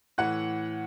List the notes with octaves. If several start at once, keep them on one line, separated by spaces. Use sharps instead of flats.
A2 E3 F#5 F#6